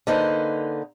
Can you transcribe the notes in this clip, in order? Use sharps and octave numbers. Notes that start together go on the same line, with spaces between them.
D3 A#3 D#4 B4 C5